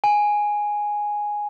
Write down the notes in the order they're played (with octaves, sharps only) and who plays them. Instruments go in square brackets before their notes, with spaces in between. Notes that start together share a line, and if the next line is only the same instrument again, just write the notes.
[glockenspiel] G#5